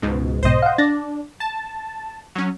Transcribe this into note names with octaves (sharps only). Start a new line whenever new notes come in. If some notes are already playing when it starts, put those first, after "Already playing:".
C#2 G#2 B2
B1 G#2 B2 C5 D#5
F5 F#5
D4 A6 A#6
A5
F#3 C#4